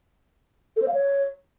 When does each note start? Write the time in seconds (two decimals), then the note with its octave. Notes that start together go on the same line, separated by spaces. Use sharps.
0.76 A4
0.82 C5
0.88 F5
0.94 C#5